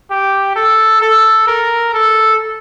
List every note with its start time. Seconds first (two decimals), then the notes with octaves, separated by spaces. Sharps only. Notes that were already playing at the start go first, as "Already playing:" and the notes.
0.10 G4
0.56 A4
1.02 A4
1.47 A#4
1.93 A4